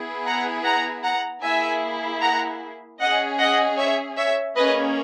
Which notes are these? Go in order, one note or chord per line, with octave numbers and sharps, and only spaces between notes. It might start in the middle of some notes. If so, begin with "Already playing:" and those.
Already playing: B3 E4 G#4
F#5 A#5
F#5 A#5
F#5 A#5
A#3 E4 G#4 E5 G#5
F#5 A#5
C#4 G#4 D#5 F#5
D#5 F#5
C#5 E5
C#5 E5
A#3 C#4 G#4 B4 D#5